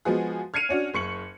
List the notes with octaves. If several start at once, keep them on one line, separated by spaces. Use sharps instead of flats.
F3 G#3 B3 F#4 G#4
F6 G#6 C7 C#7 D#7 F7
C#4 D4 F#4
F#1 C#6 C#7 F#7